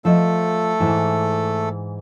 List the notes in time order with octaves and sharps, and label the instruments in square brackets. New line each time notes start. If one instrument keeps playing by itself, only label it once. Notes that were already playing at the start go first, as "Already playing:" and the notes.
[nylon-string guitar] F3 D#5 [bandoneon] A3 A4
[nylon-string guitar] G#2 E3